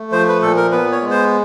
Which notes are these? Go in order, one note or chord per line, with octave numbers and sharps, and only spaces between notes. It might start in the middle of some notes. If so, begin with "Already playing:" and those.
Already playing: A3
F3 C5
B4
A#2 A4
A#4
B3 B4
C#5
G#3
C5